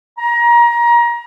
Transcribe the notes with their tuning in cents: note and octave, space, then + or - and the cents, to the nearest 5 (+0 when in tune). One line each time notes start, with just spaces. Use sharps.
A#5 +25